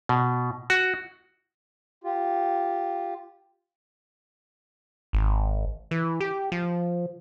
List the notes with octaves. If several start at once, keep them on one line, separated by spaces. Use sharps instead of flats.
B2
F#4
F4 G4
G#1
E3
G4
F3